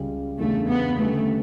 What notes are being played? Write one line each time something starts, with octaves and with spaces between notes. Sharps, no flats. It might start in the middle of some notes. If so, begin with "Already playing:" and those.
Already playing: C#2 C#3 G3
E2 C#3 G3 A3 D4
B3
D3 G3 A3 C#4 G4 B4